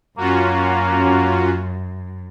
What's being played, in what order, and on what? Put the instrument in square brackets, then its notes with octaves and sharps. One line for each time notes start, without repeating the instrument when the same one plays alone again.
[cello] F#2 [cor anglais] A#3 [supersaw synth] C#4 F4 F#4